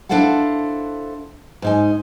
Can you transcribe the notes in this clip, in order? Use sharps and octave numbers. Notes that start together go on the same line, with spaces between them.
D4 E4 A4 C5 F5 F#5
G#2 D#4 G#5